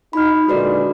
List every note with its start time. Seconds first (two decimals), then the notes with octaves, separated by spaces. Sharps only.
0.13 D#4 B5 F6
0.48 A#2 D3 G#3 F#4 B4 D5